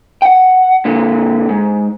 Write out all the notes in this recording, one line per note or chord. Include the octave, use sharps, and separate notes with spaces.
F#5 G5
A#2 D3
G#2